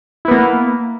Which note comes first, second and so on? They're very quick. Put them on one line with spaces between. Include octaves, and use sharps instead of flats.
E4 B3 A#3